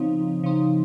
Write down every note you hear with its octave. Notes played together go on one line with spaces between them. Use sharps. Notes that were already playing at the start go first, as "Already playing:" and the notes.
Already playing: C#3 F3 C4 D#4
C#3 F3 C4 D#4